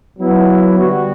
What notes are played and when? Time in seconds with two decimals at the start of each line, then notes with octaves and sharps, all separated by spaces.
0.19 F#3 B3 E4
0.79 D3 G3 B3 F#4